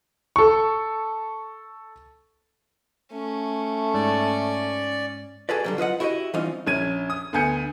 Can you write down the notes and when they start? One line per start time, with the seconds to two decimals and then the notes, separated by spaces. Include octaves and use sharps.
0.36 A4 C#6
3.12 A3 C#4
3.94 G#2 D5
5.49 F#4 G#4 A4 B4 D5
5.64 D3 F#3 G3
5.78 F4 B4 D#5 F#5
6.00 E4 F#4 G4 C5 D#5
6.34 E3 G3 C4 C#4 D#4 F4
6.67 A#1 C#4 G#6 D#7
7.10 D#6
7.33 D2 B3 G#5 G6 C#7